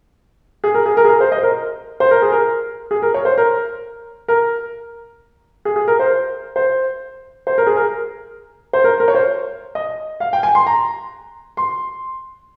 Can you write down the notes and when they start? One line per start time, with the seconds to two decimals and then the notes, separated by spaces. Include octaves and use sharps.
0.64 G#4
0.74 A#4
0.86 G#4
0.97 A#4
1.04 G#4
1.09 A#4
1.20 C5
1.32 D#5
1.38 C5
1.43 A#4
2.00 C5
2.11 A#4
2.22 G#4
2.32 A#4
2.91 G#4
3.02 A#4
3.14 C#5
3.25 C5
3.38 A#4
4.28 A#4
5.65 G#4
5.76 G#4
5.88 A#4
6.00 C5
6.56 C5
7.47 C5
7.58 A#4
7.67 G#4
7.76 A#4
8.73 C5
8.84 A#4
9.00 A#4
9.08 C#5
9.15 C5
9.75 D#5
10.20 F5
10.33 G5
10.43 G#5
10.55 C6
10.67 A#5
11.57 C6